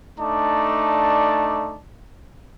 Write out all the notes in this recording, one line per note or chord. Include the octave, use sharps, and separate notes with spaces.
A3 D4 D#4 D5 A5